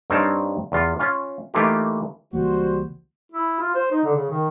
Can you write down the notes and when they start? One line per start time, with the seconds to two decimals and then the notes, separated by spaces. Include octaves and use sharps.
0.10 G2 C4 D#4 C#5 F5 A5
0.72 E2 F4
0.99 C#4 F4
1.54 E3 A3 A#3 D#4 F4 G4
2.33 C#2 E3 G3 A#3 F#4 C5
3.32 E4
3.60 F4
3.75 C5
3.92 D#4
4.04 D3
4.16 C#3
4.30 D#3